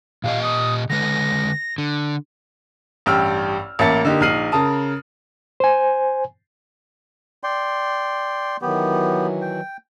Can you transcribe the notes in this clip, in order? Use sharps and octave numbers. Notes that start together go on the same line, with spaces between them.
A#2 G4 D#5 F5
D#6
D3 G#3 B4 A#6
D3
A1 G2 G5 E6 F6
A1 A#3 E5 A5 A6 C#7
D3 A#3 D#4 G4
A#1 D#4 F6 C7 D#7 F#7
C#3 A#4 A5 D#6
C5 G#5
D5 G5 C6
D#3 E3 F#3 B3 G4
G5